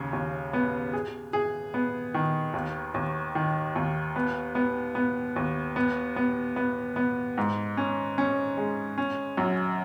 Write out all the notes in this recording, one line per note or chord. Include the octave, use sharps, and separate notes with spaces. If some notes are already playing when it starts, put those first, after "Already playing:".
Already playing: D#2 C#3
D#2
B3
G#4
G#4
B3
D#3
D#2
D#2
D#3
D#2
B3
B3
B3
D#2
B3
B3
B3
B3
G#2
C#4
C#4
G#3
C#4
F#2